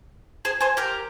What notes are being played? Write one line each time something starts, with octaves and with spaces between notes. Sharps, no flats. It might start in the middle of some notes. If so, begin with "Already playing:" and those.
G#4 C5
G#4 C5
G4 A#4